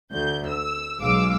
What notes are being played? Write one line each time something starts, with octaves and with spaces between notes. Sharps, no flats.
D2 G6
E6
B1 G#3 F5 D6 E6